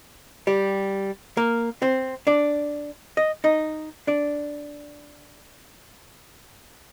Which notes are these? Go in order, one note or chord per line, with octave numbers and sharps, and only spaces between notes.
G3 G4
A#3 A#4
C4 C5
D4 D5
D#5
D#4 D#5
D4 D5